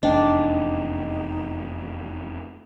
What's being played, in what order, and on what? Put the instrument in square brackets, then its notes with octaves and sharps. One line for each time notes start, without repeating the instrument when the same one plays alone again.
[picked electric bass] F1 E2 [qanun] D4 [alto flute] D#4 [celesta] D#5 G5